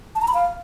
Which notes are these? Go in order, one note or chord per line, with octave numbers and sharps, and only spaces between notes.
A5
A#5
B5
F5